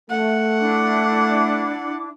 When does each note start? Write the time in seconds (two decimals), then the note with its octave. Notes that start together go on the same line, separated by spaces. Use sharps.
0.11 A3 F#5
0.60 D4 E4 D6